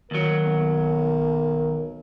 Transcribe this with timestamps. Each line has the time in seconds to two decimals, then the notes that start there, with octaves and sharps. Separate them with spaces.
0.11 D#2 F#3 A#4
0.45 B1